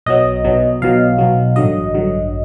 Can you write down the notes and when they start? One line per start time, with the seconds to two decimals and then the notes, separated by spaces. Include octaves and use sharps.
0.06 B1 B2 F#3 D#5
0.44 B1 B2 F#3
0.82 B1 B2 F#3 F5
1.18 B1 B2 F#3
1.56 A1 G2 D3 F#3 D#5
1.94 A1 G2 D3 F#3